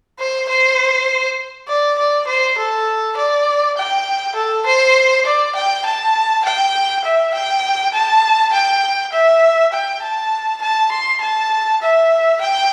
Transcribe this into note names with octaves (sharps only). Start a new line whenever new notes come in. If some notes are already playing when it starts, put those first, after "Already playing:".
C5
C5
D5
D5
C5
A4
D5
G5
A4
C5
D5
G5
A5
G5
E5
G5
A5
G5
E5
G5
A5
A5
C6
A5
E5
G5